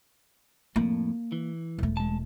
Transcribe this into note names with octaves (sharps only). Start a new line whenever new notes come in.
F2 A2 A#3
E3
E1 A3
G#3 A5